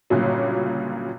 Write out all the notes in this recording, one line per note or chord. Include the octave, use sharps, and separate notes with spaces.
G1 A#2 C#3 F#3